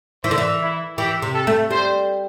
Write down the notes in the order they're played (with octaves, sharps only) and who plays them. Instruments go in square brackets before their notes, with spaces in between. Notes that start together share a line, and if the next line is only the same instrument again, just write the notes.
[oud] E3 [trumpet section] C5
[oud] D3
E3
[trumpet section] E4
[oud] E3 [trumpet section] G4
[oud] C3
[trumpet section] A4
[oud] A3
[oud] G3 [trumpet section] C5